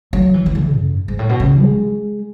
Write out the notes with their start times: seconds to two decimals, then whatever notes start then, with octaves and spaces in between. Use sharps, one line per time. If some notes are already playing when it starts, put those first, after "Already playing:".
0.13 F#3
0.34 E3
0.46 E3
0.55 D3
0.77 F#2
1.08 G#2
1.19 A2
1.29 B2
1.40 C#3
1.61 G#3